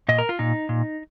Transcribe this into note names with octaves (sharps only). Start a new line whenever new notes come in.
A#2 D#5
A#4
F4
A#2 D#4
A#2